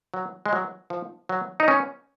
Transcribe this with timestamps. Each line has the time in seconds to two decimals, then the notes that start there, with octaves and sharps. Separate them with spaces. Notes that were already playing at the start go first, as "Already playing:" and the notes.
0.14 F#3
0.46 G#3
0.53 F#3
0.90 F3
1.29 F#3
1.60 D#4
1.68 C#4